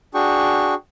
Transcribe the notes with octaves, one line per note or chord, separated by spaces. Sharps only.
D4 F#4 G#4 G5 C#6